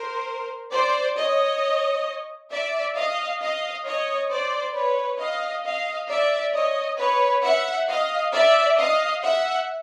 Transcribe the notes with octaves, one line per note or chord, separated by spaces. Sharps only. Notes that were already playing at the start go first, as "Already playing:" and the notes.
Already playing: A#4 C5
C5 D5
C#5 D#5
D5 E5
D#5 F5
D#5 F5
C#5 D#5
C5 D5
B4 C#5
D#5 F5
D#5 F5
D5 E5
C#5 D#5
B4 C#5
E5 F#5
D#5 F5
D5 E5
D#5 F5
E5 F#5